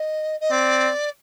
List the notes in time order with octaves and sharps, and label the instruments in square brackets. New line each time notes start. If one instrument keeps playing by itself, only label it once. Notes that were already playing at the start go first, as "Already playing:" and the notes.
Already playing: [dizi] D#5
D#5
[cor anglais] C4 [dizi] D5